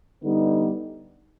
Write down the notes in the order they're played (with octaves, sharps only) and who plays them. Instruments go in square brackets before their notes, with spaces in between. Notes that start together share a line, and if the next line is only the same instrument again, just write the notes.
[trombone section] D3 G3 B3 D#4